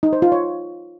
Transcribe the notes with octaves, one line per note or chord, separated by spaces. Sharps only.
D#4
C5
F4
C#5